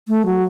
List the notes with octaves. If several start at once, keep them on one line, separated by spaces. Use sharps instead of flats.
A3
F#3